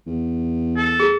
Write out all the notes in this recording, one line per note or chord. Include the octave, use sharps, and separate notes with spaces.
E2
A4
G#4